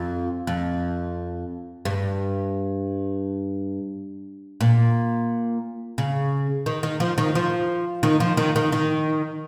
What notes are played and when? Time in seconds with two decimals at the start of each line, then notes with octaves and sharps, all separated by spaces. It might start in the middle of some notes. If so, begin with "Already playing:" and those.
Already playing: F2
0.47 F2
1.85 G2
4.61 A#2
5.98 C#3
6.66 D#3
6.83 D#3
7.00 F3
7.18 D#3
7.35 F3
8.03 D#3
8.20 F3
8.37 D#3
8.56 D#3
8.72 D#3